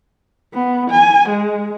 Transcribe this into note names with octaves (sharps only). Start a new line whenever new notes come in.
B3
G#5
G#3